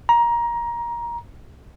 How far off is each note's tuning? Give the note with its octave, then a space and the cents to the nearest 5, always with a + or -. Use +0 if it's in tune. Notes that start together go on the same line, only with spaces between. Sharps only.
A#5 +20